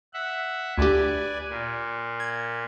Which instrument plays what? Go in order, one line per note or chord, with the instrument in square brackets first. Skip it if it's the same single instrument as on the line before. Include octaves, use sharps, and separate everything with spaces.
[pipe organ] E5 F#5
[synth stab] D2 G4 [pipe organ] B4 D5 G#5
[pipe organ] A#2
[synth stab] G#6